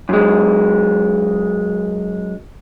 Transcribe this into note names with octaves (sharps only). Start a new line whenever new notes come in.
F#2 G#3